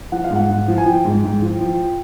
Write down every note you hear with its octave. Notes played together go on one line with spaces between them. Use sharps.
F3 F#5
F5
G#2 F#5
G#2
F3
G#5
F3 G5
G#2
G#2
F3
F3